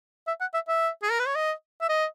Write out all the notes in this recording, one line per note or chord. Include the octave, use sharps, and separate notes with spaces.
E5
F#5
E5
E5
G#4
A#4
B4
C#5
D#5
E5
D#5